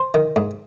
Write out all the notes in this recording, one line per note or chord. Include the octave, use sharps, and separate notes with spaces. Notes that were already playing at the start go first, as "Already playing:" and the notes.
Already playing: C5
D#3
G#2